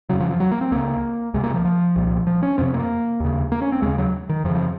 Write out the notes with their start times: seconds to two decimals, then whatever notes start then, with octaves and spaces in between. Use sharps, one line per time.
0.09 F2 C#3 F#3
0.20 F3
0.31 F3
0.40 F#3
0.51 A#3
0.61 C4
0.71 C#2 C#3 A#3
1.34 C#2 C3 G#3
1.44 A#3
1.54 F3
1.65 F3
1.96 C2 A#2
2.27 F3
2.43 C#4
2.58 F2 C3 C4
2.74 A#3
3.20 D#2 C#3
3.52 A#3
3.62 C#4
3.72 C4
3.82 D#2 C#3 G#3
3.98 F#3
4.29 D#3
4.44 F2 C#3 F3
4.55 F3